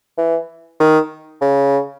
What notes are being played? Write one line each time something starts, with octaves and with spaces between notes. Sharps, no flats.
E3
D#3
C#3